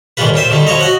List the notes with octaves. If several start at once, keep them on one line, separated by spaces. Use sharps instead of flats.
D#2 A2 E3 G3 F4 B4
A#2 F4 C5 E5
D3 D#3 G3 E4
F3 E4 C#5 D#5
F#4 D#5 F#5